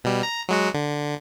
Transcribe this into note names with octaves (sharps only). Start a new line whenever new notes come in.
B2 G3
A#5
F#3 G#3 F#4
D3